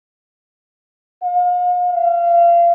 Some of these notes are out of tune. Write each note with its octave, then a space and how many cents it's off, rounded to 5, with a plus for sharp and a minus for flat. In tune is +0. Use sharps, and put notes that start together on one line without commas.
F5 +45
F5 -30